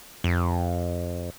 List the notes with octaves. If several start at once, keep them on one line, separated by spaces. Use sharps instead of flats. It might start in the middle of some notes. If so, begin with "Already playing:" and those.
F2